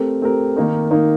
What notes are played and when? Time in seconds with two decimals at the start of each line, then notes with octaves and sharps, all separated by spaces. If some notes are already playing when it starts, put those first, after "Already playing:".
Already playing: A3 C4 G4 A#4
0.22 A3 C4 G4 A#4
0.56 D#3 A#3 D#4
0.91 D#3 A#3 D#4